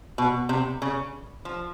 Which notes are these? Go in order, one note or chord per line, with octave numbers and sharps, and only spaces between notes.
B2
C3
C#3
F3